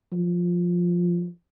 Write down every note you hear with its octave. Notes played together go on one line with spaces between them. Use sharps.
F3